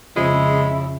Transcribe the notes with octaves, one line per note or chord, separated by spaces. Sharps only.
F2 C#3 F3 G#3 E4